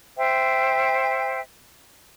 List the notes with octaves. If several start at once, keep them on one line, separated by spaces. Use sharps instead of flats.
C5 E5 G5